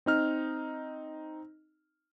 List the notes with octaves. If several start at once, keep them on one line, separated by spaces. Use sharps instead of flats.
C4 D#4 F6